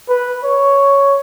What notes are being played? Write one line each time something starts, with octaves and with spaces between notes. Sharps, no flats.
B4
C#5